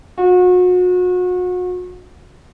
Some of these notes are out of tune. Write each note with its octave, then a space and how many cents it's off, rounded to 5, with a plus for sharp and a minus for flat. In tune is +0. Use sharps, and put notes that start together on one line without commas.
F#4 -35